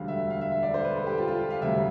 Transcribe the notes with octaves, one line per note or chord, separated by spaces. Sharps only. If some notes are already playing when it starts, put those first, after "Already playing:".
Already playing: E1 D2 D3 G3 F5
E5
F5
E5
E5
D5
C5
B4
A4
G4
F4
F4
F5
E1 D2 C3 G3 E5